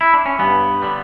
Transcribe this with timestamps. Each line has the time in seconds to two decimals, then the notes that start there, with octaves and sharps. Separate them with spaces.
0.01 E4
0.14 D4
0.26 C#4
0.39 G2 B3
0.82 D3 G3